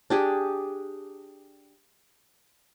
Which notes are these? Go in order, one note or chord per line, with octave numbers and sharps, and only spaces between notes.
D4 G4 G#4